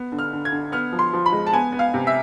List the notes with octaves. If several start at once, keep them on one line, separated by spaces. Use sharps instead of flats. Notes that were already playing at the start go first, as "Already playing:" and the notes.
Already playing: B3
D3
F6
D3
G#6
D3
B3 F6
F3
C6
F3
B5
G#3
A5
B3 G#5
B3
F5
C3
E5